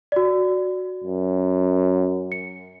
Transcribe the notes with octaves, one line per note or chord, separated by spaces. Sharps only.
F#4 D5
F#2
C#7